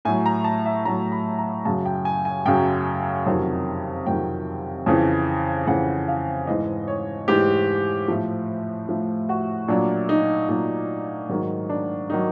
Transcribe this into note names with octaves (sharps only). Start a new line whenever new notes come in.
A2 F#3 G#5
A#5
A5
E5
A2 F#3 A#5
B5
A#5
F#2 C#3 F#3 A5
G5
G#5
G#5
F#2 C#3 F#3 G5
F2 C3 D#3 F#3
F2 C3 D#3 F#3 G5
F2 C#3 E3
F2 C#3 E3 F#5
F5
G#2 E3 D#5
C#5
G#2 E3 G4
A2 F3
A2 F3
F#4
A#2 F#3 D4
D#4
A#2 F#3 D#4
G#2 D#3 F#3 D#4
D4
D#3 F#3 D#4